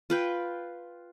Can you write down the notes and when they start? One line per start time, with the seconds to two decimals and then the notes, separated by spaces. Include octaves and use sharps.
0.10 F4 B4 G5